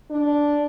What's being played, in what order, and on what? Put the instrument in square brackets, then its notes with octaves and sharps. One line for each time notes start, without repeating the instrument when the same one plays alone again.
[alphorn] D4